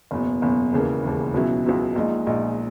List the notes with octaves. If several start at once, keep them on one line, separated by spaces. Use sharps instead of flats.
F#1 E2 B2
F#1 E2 B2
E1 D#2 C#3 E3 A#3
E1 D#2 C#3 E3 A#3
C#2 B2 F#3 C#4 E4
C#2 B2 F#3 C#4 E4
A#1 A#2 G#3 D#4
A#1 A#2 G#3 D#4